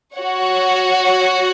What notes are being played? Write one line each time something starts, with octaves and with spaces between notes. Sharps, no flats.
F#4 C#5 F#5